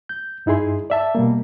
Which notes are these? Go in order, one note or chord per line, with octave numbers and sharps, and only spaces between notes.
G6
G2 D#4 E4 G#4 C6
D5 E5 A5
B2 G3 A#3